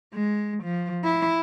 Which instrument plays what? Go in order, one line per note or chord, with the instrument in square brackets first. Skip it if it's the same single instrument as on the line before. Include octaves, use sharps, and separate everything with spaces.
[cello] G#3
F3
E4